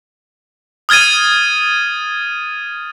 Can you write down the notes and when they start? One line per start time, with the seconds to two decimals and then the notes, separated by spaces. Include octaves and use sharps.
0.89 D#6 F6 G#6 A6 D#7